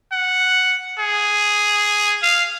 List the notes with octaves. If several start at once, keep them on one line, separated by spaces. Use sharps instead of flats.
F#5
G#4
F5